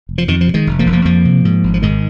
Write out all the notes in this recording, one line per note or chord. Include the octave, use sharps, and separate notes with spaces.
F1
F3
F2 D#3
F3
C3
D#3 G#3
F1
F3 A#3
F1
F3 A#3
F2 F3 A#3
C3
G#2
G#1
F3
G#2 D#3 G#3